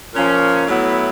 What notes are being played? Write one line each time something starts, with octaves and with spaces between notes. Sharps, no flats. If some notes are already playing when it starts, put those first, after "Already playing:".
A#2 F3 A#3 C#4
A2 F#3 B3 E4